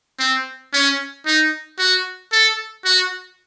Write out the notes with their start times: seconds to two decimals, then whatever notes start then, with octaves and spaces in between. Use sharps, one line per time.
0.19 C4
0.73 C#4
1.26 D#4
1.79 F#4
2.32 A4
2.85 F#4